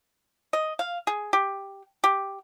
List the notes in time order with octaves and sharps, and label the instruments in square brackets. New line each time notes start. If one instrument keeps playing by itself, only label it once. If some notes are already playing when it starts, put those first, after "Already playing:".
[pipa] D#5
F5
G#4
G4
G4